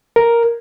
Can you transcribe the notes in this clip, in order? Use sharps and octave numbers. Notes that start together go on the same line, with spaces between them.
A#4